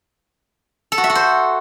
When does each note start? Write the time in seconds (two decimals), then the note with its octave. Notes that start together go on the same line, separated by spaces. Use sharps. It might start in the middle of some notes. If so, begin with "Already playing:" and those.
0.92 A4
0.98 F#4
1.04 E5
1.10 F#4
1.15 C5